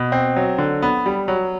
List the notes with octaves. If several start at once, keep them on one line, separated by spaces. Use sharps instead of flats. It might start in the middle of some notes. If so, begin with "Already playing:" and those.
Already playing: B2
C4
F#3
D3
B3
G3
F#3